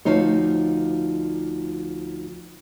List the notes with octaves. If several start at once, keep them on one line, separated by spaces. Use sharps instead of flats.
D2 F3 D#4 C5 C#5